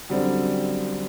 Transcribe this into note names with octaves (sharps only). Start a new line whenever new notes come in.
F#2 D3 G3 C4